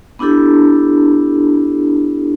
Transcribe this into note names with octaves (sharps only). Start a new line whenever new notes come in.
B3 D4 E4 G4 A4